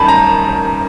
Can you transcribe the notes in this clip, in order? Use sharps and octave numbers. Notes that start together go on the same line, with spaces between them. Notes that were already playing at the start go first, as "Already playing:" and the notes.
Already playing: F#2 D#3 G3 A5 B5
A#5